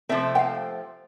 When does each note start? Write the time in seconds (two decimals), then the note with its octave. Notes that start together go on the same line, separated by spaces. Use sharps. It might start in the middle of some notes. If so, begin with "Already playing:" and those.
0.09 C3 F3 A3 C4 E5
0.35 G5
0.38 F5